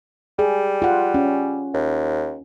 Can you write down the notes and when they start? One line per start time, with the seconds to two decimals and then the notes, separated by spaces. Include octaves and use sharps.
0.39 G3 G#4
0.82 F4 F#5
1.14 C#4
1.74 D#2